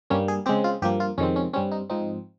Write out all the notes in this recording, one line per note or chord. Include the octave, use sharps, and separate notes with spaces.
G2 G3 A#3 C#4
G#4
C#3 G#3 C4 G4
F4
G2 F3 A#3 G4
F4
F2 C3 D#3 G#3 C4 C#4
C#4
G2 G3 C4 C#4
D#4
G#2 F3 C4 D#4